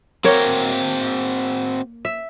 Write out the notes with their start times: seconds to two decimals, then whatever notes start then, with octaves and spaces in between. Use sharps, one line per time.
0.24 A#3 C4 F#4 A#4 C#5 G5
2.05 E5